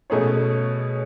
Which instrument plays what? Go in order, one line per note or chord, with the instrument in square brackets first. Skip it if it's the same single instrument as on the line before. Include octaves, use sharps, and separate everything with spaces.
[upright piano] B2 A3 C#4 G#4 C#5